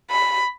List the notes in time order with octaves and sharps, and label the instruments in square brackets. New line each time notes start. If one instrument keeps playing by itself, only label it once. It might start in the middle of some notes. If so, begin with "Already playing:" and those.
[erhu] B5